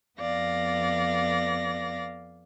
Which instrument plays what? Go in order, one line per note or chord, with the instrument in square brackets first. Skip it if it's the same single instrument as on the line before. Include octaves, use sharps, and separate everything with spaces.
[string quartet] F2 B3 D5 F5 A#6